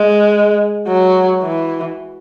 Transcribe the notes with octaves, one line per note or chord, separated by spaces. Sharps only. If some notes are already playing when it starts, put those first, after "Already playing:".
Already playing: G#3
F#3
E3